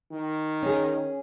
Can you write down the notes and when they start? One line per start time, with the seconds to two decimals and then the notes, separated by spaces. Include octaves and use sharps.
0.11 D#3
0.63 C#4 G#4